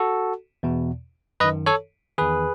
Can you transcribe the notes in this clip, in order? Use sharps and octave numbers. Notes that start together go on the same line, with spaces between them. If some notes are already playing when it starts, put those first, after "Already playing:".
Already playing: F#4 A4
E2 B2
F#2 D#3 B4 D#5
A4 C#5
E2 D#3 G#4 B4